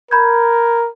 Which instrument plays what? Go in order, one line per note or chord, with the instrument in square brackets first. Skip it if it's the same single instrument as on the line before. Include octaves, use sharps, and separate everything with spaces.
[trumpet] A#4 [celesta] B5 G6 G#6